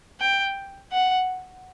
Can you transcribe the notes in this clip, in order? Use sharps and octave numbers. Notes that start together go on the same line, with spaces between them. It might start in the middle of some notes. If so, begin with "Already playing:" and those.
G5
F#5